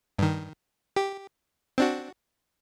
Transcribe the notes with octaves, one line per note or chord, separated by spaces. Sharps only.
G2 D#3
G4
C4 D4 F#4